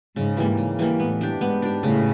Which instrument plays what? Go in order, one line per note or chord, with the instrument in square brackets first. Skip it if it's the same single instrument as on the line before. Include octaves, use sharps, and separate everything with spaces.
[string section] G#2 [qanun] C#3
[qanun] E3 G3 A#3
C#3
E3 G3 A#3
[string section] A2 [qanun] B3
[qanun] D4 G4
[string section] G#2 [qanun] B3
[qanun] D4 G4
[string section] A2 [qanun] C#3